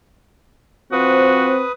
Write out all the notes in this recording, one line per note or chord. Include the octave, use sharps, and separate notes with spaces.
F3 C4 F#4 B4 D#6